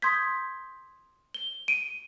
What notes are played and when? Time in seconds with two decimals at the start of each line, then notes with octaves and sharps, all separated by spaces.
0.02 C6 D#6 G6 G#6 B6
1.34 G7
1.68 D7 D#7